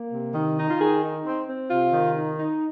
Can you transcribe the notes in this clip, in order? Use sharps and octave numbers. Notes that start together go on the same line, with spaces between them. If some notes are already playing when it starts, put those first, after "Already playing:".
Already playing: A#3
C3
D#3
D#4
F4
D#3 G#4
D#4
C4
C4
C3 F4
D#3
D#4
D#4